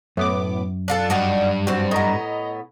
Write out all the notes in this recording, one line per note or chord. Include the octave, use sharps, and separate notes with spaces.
F#2 A2 B3 D6
D4 F4 A4 F#6 C7 C#7
G2 D#4 F#4 D5
G3 C4 F#4
A2 B3 D#5 A#5